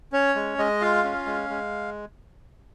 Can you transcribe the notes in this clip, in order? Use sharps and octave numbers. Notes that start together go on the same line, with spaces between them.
C#4 C#5
G#3
G#3 D#5
F4 F5
C#4
G#3
G#3